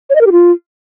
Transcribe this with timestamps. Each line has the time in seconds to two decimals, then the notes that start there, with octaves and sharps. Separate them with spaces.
0.10 C#5
0.15 D#5
0.21 A#4
0.26 G4
0.32 F4